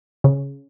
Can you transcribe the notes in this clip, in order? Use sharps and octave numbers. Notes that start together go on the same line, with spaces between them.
C#3